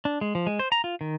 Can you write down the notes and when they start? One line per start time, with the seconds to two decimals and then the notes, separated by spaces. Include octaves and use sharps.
0.05 D4
0.21 G#3
0.35 F3
0.47 G#3
0.59 C5
0.72 A#5
0.84 F4
1.01 D#3